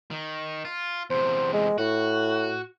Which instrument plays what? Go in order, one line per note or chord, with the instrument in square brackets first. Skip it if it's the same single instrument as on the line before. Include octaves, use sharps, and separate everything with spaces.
[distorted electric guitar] D#3
F4
[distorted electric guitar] E2 C3 [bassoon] C5
[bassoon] G#3
[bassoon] A2 [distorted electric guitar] F#4